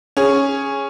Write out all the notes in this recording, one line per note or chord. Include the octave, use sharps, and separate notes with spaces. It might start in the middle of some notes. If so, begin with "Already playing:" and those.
C#4 G#4